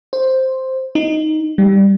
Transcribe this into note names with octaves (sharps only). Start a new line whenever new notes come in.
C5
D#4
G3